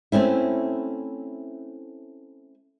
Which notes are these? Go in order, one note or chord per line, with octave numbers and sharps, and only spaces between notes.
A3 C4 C#4 E4